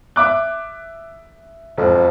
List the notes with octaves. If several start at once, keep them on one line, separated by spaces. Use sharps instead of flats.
E5 D6 F#6
E1 F2